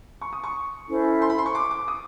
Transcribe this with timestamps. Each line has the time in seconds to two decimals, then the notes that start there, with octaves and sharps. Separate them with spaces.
0.21 C#6
0.33 D#6
0.44 C#6
0.88 C#4 E4 A4 C5
1.22 C6
1.30 B5
1.38 C6
1.46 C#6
1.55 D6
1.71 D6
1.88 D#6